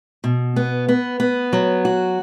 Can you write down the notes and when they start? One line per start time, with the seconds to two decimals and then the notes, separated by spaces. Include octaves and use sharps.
0.24 B2
0.56 B3
0.88 B3
1.20 B3
1.53 F#3
1.85 F#4